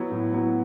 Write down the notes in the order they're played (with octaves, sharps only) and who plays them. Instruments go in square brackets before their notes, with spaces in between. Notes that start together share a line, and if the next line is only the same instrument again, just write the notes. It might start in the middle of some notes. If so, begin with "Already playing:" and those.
Already playing: [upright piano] F#3 B3 E4
A2
F#3 B3 E4